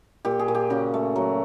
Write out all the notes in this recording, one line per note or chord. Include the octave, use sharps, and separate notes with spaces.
A#2 G4
G#4
A#2
G4
C#3 F#4
A3
F#3